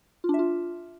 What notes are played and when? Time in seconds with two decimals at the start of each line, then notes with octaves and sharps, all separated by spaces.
0.24 F4
0.29 D4
0.34 E5
0.39 F4